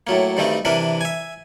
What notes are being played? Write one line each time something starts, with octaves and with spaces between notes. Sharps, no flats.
A2 F#3 A#3
G2 D#3 G3 A3 C4
C3 E3 D4 A#4 B4
E5 G#5